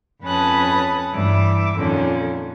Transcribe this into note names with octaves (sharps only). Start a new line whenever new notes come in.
F2 C#4 B4 A5 D#6 F#6
G2 E3 E5 D6
F2 A#2 D3 D#3 C#4